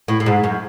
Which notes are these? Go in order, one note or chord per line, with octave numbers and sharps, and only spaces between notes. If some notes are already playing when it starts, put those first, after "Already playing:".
A2
A2
G#2
F#2